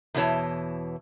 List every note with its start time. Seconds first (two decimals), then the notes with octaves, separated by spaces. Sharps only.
0.14 E2 B2 E3 C#5 A5